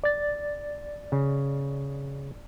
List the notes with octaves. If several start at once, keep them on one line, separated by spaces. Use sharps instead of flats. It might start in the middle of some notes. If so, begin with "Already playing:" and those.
D5 A6
C#3